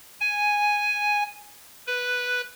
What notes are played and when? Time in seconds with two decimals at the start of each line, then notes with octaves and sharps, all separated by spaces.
0.21 G#5
1.87 B4